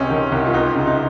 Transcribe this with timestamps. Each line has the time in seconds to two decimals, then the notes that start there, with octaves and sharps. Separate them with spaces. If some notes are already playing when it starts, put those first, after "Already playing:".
Already playing: C#2 C3 C#4
0.10 D#3
0.32 C2
0.46 F4
0.54 C#2 D#4
0.76 C#3
0.87 D#4